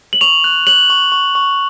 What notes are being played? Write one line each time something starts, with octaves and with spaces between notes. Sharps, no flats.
F#7
C#6 F7
F#6
F#6 F#7
C#6
C#6
C#6